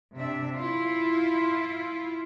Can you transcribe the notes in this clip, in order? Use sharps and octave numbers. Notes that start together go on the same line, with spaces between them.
C3 D4 E5
E4 F4